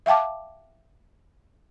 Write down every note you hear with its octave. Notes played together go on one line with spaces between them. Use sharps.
E5 F5 G5 A5 D6